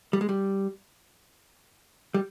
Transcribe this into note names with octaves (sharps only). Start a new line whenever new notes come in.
G3
G#3
G3
G3